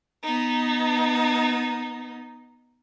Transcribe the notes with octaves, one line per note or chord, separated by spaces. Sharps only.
B3 D#4